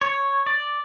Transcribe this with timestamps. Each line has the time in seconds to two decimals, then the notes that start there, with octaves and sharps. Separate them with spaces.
0.01 C#5
0.46 D5